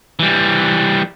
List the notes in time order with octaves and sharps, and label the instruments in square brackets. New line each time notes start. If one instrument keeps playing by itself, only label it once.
[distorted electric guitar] E3 G3